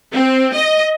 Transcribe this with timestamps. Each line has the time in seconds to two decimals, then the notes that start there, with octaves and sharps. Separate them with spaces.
0.14 C4
0.54 D#5